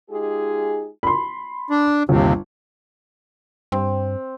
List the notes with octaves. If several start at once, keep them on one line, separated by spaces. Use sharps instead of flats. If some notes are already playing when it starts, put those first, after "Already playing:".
G#3 D#4 F4 G4 G#4
B5 C6
D4
G1 D#2 C3
G2 C4